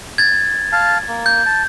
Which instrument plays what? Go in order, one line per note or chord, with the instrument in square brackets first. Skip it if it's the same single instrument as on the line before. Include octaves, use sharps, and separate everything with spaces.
[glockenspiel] G#6 A6
[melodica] F5 A5
A#3
[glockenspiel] G6
[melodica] A5